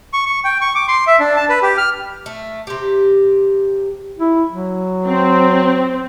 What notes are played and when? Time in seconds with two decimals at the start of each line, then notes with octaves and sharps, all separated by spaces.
0.13 C#6
0.26 C#6
0.45 G5
0.61 C#6
0.75 D6
0.88 C6
1.07 E5
1.20 D4
1.36 A5
1.49 B4
1.62 G4
1.78 F6
2.26 A3
2.67 C3 G4
4.19 E4
4.52 F#3
5.07 C4